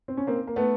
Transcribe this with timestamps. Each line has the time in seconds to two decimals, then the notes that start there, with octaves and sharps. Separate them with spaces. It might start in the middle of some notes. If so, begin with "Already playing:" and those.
0.08 C4
0.17 C#4
0.27 A#3 C4
0.47 A#3
0.56 A3 B3